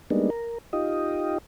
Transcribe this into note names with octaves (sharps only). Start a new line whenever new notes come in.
G3 G#3 A#3 B3 D4 D#4
A#4
D#4 F4 G4 D#5